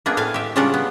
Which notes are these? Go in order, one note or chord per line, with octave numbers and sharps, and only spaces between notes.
A#3 B3 D4 G#4
A2 F5 G#5
G4 E5
C#3 G3 G#3 D4 F4 F#5
B3